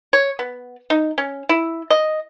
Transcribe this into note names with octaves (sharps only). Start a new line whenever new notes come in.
C#5
B3
D#4
C#4
E4
D#5